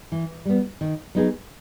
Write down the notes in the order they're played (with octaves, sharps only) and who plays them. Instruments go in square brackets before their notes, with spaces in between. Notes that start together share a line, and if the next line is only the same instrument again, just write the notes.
[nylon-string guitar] E3
G3 B3
D#3
F#3 B3 D#4 G#4